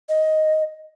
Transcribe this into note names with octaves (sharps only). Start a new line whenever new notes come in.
D#5